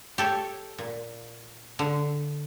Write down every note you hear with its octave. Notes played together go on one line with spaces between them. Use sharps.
G4 A4 C#5
A#2
D3